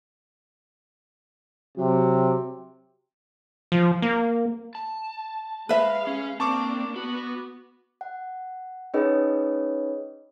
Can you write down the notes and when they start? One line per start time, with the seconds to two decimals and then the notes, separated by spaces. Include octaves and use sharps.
1.77 C3 F#3
3.72 F3
4.02 A#3
4.75 A5
5.69 G#3 B4 E5 F5
6.07 C#4
6.40 A#3 C4 D4 A5 C#6 D6
6.96 B3 F#4
8.01 F#5
8.94 C#4 D#4 G#4 B4 C#5 D#5